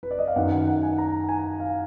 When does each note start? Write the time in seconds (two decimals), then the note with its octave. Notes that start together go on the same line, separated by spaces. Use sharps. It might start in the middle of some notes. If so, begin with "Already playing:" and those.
0.03 B4
0.11 D5
0.19 D#5
0.27 F5
0.36 F#2 D#3 F#5
0.52 F#5
0.68 F#5
0.83 G#5
0.98 A#5
1.29 G#5
1.60 F5